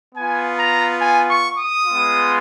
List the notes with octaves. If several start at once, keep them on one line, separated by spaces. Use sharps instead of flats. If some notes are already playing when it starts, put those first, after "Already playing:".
B3 F4 G#5
A#5
G#5
C#6
D#6
G#3 B3 F4